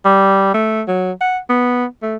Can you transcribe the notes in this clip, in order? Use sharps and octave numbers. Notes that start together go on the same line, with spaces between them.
G3
A3
F#3
F#5
B3
A3